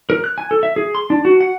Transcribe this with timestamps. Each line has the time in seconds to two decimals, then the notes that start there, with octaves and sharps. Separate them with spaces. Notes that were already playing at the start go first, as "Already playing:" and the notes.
0.10 A#4
0.24 F#6
0.38 G#5
0.51 A4
0.63 E5
0.76 G#4
0.95 C6
1.10 D4
1.25 F#4
1.41 F#5